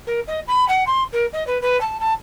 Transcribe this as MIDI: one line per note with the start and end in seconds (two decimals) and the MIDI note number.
0.07 0.20 70
0.27 0.40 75
0.47 0.67 83
0.68 0.84 78
0.87 1.04 84
1.12 1.26 70
1.33 1.46 75
1.47 1.58 71
1.61 1.79 71
1.81 1.98 81
2.00 2.13 81